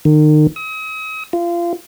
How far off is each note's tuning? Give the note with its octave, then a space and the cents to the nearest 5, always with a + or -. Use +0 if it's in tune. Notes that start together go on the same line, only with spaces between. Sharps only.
D#3 -35
D#6 +40
F4 -25